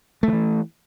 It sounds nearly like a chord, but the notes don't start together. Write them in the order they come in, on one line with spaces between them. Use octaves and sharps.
A3 D#3 E3